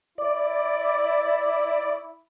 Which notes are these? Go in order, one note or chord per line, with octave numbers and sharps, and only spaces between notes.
E4 D5